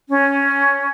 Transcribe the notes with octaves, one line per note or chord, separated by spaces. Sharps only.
C#4